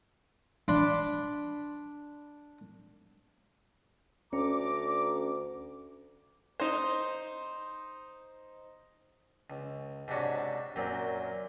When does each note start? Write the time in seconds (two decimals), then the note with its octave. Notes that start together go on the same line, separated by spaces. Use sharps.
0.68 D4 D5 B5 C6
4.33 D2 C#4 D5 A#5 D6
6.60 D#4 C5
9.50 C#2
10.08 G#2 C3 D4 F#4 C#5
10.76 F#2 A#2 F#3 C4